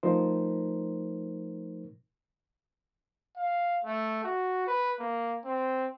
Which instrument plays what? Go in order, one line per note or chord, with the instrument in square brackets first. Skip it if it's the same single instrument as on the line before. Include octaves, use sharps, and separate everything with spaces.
[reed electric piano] F3 A3 D#4 A#4 C5
[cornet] F5
A3
F#4
B4
A#3
C4